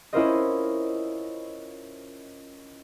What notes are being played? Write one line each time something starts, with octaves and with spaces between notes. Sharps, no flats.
C#4 E4 F4 A#4 C5 D#5